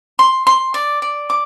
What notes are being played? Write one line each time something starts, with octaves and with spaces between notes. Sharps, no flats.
C6
C6
D5
D5
D6